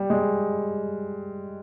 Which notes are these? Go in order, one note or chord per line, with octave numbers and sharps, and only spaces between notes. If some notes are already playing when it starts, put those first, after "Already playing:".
Already playing: G3
G#3